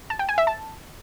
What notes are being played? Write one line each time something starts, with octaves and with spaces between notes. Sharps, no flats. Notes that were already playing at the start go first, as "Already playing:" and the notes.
A5
G5
G#5
E5
A5